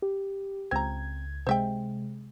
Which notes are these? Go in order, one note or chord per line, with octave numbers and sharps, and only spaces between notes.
G4
C#2 C4 A#5 G#6
C3 G#3 C5 E5 G5